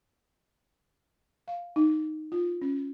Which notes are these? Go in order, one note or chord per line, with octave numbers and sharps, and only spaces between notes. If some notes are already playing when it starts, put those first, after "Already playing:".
F5
D#4
F4
C#4